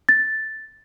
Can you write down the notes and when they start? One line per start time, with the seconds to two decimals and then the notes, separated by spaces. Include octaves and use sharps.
0.09 A6